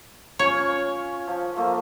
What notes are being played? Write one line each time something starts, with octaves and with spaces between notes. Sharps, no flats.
C#4 F4 C#5
F3
F3 A3 A#3